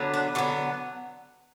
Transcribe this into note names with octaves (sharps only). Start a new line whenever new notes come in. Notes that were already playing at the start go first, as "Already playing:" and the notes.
Already playing: D3 F#3 B3
D4
D3 F#3 B3 C#4